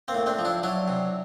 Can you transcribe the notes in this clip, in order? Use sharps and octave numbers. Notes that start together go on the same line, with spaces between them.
A#3 C4
A2
C4 D4
F3
D4 E4
F#3 D4 E4
C3